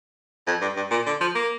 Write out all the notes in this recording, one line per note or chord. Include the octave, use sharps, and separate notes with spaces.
F2
G2
G2
A#2
D3
F3
A#3